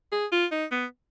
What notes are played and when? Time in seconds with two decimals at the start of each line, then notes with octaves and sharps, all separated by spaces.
0.12 G#4
0.32 F4
0.51 D#4
0.72 B3